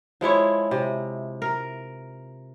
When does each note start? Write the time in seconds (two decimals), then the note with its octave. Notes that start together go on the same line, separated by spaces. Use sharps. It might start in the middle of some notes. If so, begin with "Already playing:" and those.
0.21 F3 G#3 E4 C#5
0.71 C3
1.42 A#4